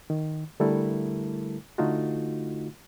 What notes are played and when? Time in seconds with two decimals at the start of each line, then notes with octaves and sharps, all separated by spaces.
0.10 D#3
0.60 D3 G3 A3 E4 A4 A#4
1.78 D3 A3 D#4 F4 F#4